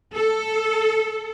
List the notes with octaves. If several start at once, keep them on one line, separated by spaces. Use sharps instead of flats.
A4